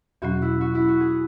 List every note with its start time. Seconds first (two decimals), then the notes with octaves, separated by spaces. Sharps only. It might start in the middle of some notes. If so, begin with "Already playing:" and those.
0.22 E2 B2 F#3 C#4 F#4
0.42 E4
0.61 F#4
0.75 E4
0.88 F#4
1.00 G#4